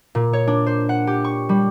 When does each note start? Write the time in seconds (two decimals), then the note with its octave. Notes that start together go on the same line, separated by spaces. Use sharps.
0.15 A#2
0.33 C#5
0.48 D4
0.66 C5
0.89 F#5
1.07 G4
1.24 C#6
1.49 G3